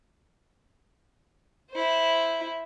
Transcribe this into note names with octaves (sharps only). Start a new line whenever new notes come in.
E4 C5